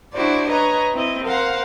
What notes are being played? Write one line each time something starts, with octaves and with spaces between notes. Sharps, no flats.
D4 E4 F#4 C5 D5
B4 C#5 D#5 A#5
C4 E4 D#5
A#4 C5 F5 F#5